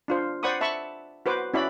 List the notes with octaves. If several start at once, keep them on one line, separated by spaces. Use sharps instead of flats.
D4 F4 C5
C5 D5 F#5 B5 C#6 D#6
E5 A5 B5 C#6
F#4 B4 C5 D6
C#4 E4 F#4 D5 E5 B5